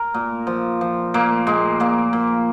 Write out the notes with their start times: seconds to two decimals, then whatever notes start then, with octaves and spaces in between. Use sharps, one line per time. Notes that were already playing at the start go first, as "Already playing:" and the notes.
Already playing: A#4
0.14 A#2
0.47 F3
0.81 F3
1.14 A#2 A#3
1.47 A#2 G#3
1.80 A#2 A#3
2.13 A#2